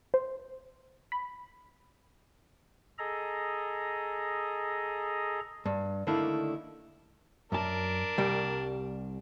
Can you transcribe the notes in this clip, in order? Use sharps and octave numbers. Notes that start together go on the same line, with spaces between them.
C5
B5
G#4 A4 D#5 A#5
G2
D3 D#3 A3 A#3 D4 E4
F#2 D4 A#4 A5
C2 G3